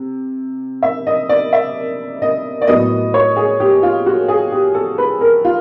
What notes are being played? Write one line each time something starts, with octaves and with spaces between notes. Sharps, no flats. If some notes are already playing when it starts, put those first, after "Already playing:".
Already playing: C3
E5
D#5
D5
E5
D#5
D5
A2 F#3 B3 D#5
C#5
G#4
G4
F4
F#4
G#4
G4
A4
B4
A#4
F4